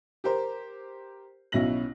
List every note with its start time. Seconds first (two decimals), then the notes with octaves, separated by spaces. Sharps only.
0.24 G4 A#4 C5
1.52 B1 B2 C#4 E4 A#6 F#7